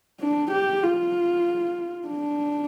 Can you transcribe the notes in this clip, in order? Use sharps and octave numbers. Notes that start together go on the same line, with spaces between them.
D4
G4
F4
D4